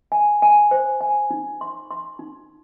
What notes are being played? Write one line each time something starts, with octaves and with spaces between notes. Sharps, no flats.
G#5
G#5
C5
G#5
D#4
C6
C6
D#4